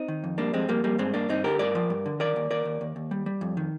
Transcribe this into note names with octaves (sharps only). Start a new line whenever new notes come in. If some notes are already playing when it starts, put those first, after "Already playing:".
Already playing: C4 D#4
D#3
F2
G3 A#3 D4
F2 G#3 C4
F2 G3 A#3
F2 G3 A#3
G2 G#3 C4
G2 A#3 D4
G2 C4 D#4
D3 G4 A#4
G2 A#4 D5
F3
G2
D3
D#3 A#4 D5
D#2
D#2 A#4 D5
D#2
D#2
D#2
G3
G3
F2
D#3